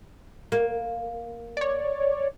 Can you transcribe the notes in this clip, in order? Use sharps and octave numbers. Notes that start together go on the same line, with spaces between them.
A#3
C#5 D5